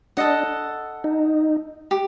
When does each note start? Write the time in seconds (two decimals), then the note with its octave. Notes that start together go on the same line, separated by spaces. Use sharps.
0.17 D4 A4 D#5 F#5
1.04 D#4
1.91 G4